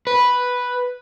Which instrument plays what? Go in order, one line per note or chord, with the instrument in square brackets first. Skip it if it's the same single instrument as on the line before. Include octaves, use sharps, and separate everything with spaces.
[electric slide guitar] B4